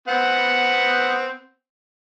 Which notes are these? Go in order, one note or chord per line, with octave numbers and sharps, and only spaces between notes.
B3 C4 F#5